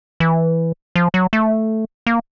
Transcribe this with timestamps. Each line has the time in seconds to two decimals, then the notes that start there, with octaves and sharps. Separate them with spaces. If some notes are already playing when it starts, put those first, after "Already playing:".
0.20 E3
0.95 F3
1.14 F#3
1.33 A3
2.07 A#3